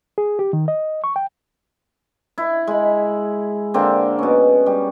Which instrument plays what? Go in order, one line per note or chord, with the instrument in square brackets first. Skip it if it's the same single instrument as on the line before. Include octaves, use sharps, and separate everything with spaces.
[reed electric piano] G#4
G4
D#3
D#5
C#6
G5
[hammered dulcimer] E4
G#3 B5
D3 A#3 C4
B2 C#4
G3